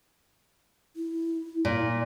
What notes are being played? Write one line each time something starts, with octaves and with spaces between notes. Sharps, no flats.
E4
A#2